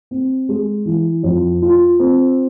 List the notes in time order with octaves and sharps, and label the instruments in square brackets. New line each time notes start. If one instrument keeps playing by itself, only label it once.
[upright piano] C4
G#3
E3
F2
F4
C4